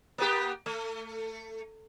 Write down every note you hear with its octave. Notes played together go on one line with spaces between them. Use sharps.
A#3 B3 G4
A3